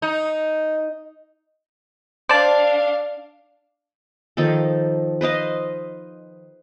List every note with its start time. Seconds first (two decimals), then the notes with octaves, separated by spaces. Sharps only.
0.02 D#4
2.29 D4 C5 D5 F5 A5
4.37 D#3 F3 D#4 A4
5.21 B4 C5 D#5 F5